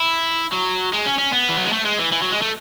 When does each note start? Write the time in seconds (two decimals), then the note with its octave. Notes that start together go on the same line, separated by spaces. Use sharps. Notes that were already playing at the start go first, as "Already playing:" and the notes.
Already playing: E4
0.53 F#3
0.93 G#3
1.06 C#4
1.19 C#4
1.33 B3
1.49 E3
1.58 F#3
1.65 G#3
1.73 A3
1.85 G#3
1.99 E3
2.12 E3
2.22 F#3
2.32 G#3
2.42 A3